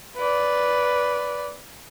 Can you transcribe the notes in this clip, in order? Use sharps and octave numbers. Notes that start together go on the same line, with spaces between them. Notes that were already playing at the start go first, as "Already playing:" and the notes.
B4 D5